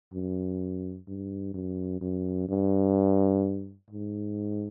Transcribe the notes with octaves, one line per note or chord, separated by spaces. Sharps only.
F#2
G2
F#2
F#2
G2
G#2